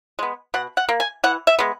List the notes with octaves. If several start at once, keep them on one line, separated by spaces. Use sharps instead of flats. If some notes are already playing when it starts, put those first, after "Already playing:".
G#3 B3
B2 F#5
F#5
A#3
G#5
E3 F#5
E5
G#3 B3